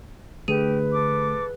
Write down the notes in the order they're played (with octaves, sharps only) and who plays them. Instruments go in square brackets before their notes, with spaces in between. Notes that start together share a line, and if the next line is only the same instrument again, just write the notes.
[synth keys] D3 A3 [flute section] G4 [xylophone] G#4 D#7 [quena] B4
[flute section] A4 D6